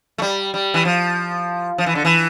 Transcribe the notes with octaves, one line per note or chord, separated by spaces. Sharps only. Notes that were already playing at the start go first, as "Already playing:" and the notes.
A3
G3
G3
E3
F3
F3
E3
D3
E3